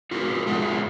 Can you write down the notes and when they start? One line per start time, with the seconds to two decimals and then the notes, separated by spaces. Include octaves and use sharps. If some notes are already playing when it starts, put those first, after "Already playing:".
0.11 F4 F#4 G#4 A#4
0.46 G#3 F4 G#4 E5 F#5